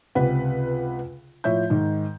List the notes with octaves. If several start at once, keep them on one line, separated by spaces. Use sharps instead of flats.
C#2 C3 B4 F#5
A2 F3 C#5 E5 G6
G#2 D#3